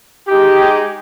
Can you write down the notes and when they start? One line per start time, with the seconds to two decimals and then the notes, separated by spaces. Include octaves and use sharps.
0.28 G#3 D#4 G4
0.58 G#4